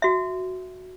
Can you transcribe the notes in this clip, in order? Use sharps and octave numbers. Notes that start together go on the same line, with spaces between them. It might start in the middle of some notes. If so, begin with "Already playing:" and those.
F#4 E5